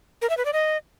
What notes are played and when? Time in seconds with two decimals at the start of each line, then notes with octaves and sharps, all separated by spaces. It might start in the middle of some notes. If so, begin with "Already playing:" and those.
0.22 A#4
0.29 E5
0.37 B4
0.45 D5
0.53 D#5